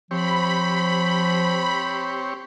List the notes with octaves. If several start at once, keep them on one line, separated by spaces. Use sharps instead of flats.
F3 C4 G4 C#5 B5